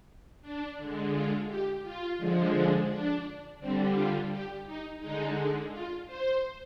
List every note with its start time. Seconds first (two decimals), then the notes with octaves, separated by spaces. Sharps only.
0.42 D4
0.78 D3 G#3
1.12 F4
1.48 G4
1.83 F4
2.18 D3 F3 G#3
2.54 D4
2.89 D4
3.59 D3 G3 C4
3.94 F4
4.31 G4
4.66 D#4
5.00 D3 G#3 D#4
5.72 F4
6.07 C5